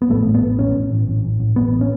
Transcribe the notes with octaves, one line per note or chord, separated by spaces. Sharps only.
B3
A1 A3
A1
B3
A2
A1 C#4
A1
A1
A1
A1
A1
A1 B3
C#4